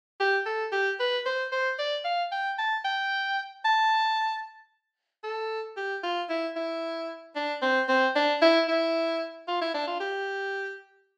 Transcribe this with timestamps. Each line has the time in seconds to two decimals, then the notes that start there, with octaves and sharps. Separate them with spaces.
0.20 G4
0.46 A4
0.72 G4
1.00 B4
1.26 C5
1.52 C5
1.79 D5
2.05 F5
2.32 G5
2.58 A5
2.85 G5
3.65 A5
5.23 A4
5.77 G4
6.03 F4
6.29 E4
6.56 E4
7.36 D4
7.62 C4
7.89 C4
8.16 D4
8.42 E4
8.68 E4
9.48 F4
9.61 E4
9.74 D4
9.87 F4
10.00 G4